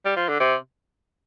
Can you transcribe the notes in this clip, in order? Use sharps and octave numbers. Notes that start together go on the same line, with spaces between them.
G3
F3
D3
C3